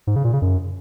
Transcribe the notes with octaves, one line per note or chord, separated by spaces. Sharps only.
G#2
C#3
A#2
C#3
F#2